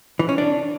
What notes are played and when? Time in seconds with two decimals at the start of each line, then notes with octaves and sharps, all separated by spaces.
0.19 E3
0.29 C#4
0.38 D4